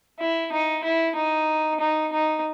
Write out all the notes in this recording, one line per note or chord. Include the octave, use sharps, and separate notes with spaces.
E4
D#4
E4
D#4
D#4
D#4